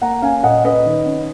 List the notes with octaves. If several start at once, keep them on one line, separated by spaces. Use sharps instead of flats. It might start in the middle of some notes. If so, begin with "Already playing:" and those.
A#3 F#5 A#5
C#4 F5 G#5
A#2 D#5 F#5
C#4 B4 D#5
D#3
C#4